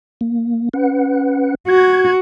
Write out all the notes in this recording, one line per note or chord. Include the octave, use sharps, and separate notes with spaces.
A#3
C#4 B4 F#5
F#4 G#6